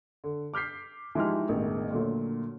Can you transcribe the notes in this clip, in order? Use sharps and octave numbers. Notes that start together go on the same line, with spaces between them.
D3
D6 F6 G6 B6 C7
E3 F3 G#3 D#4 G4 F6
E1 A1 D#3
A#2 D3 F#3 A3